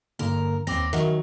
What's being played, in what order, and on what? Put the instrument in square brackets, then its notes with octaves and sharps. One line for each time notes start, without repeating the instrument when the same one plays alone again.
[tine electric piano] G2 D3 A#3 [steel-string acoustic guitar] A#4
[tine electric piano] D#2 D6 A#6 [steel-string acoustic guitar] B3 C4
[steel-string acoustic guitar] D#3 F#3 [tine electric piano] A#4 E5 F#5